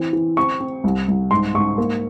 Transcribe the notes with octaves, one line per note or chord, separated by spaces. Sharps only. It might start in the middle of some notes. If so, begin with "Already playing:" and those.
Already playing: E3 C4
E3
C4 C#6
C4
C2
C2
G#2 C6
G#2 C#6
A#3